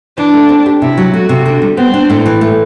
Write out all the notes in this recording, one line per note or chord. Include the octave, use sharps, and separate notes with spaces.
E3 D4
A3
C4
G4
C3 E4
F#3
A3 F#4
C3
D3
G3
B3 C4
D4
A2
E3
A3